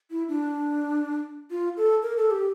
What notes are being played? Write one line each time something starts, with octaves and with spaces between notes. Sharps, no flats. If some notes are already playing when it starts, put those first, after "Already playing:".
E4
D4
F4
A4
A#4
A4
G4